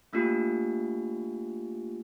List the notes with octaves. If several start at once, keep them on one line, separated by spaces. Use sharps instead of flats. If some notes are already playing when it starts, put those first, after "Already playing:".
A3 A#3 D4 F4 G4